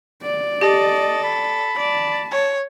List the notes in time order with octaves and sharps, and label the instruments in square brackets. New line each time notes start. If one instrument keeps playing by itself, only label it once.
[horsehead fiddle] D5
[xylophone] G4 [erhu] A4 [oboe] D#5
[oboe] B5
[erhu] D5 [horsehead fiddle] A5
[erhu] C#5